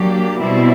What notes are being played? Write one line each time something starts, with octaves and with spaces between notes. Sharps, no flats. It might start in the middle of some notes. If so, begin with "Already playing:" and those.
Already playing: F#3 A#3 D4 G4
B2 G3 C4 E4